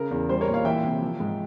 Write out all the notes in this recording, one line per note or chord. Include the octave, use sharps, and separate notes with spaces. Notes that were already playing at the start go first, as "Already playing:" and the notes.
Already playing: C#3 A#4
E2
G3 C5
A#4 C#5
A#2
C#5 F5
E3 E5 G5
C3
F3
G#2